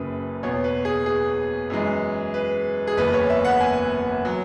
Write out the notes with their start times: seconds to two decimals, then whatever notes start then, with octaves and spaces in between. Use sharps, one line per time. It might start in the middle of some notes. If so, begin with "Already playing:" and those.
Already playing: F#1 F#2 C#3 B4
0.43 E2 B2 B3 C#5
0.64 B4
0.85 G#4
1.06 G#4
1.70 F#2 E3 G#3
2.34 B4
2.87 G#4
2.97 F#1 E2 E3 B3 B4
3.14 C#5
3.30 E5
3.45 F#5
3.61 G#5
4.25 F#3